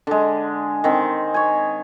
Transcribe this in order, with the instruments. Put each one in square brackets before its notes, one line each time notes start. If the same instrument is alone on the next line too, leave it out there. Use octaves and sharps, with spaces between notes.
[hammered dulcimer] D3 G#3
D#3 C4
C#5 G#5